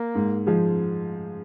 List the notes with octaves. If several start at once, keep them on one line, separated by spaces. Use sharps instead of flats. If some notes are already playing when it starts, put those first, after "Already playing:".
Already playing: A#3
G#2
F3 G#3